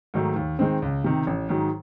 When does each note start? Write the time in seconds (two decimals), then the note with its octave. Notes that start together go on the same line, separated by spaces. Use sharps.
0.14 G#2 D#3 F#3 A3
0.36 D#2
0.59 D#3 G#3 C4
0.82 C#2
1.04 C3 D#3
1.27 A1
1.49 G#2 D#3 F#3